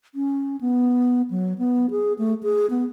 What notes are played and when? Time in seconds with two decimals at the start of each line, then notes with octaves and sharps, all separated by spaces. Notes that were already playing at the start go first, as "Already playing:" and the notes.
0.15 C#4
0.61 B3
1.30 F#3
1.58 B3
1.91 G#4
2.19 A3
2.43 G#4
2.70 B3